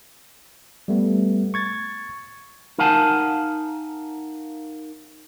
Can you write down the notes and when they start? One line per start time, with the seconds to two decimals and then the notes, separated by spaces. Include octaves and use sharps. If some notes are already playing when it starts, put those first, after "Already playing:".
0.88 G3 A3 B3
1.54 C#6 G#6 A6
2.78 D#4 A#4 F5 F#5 G#5 A5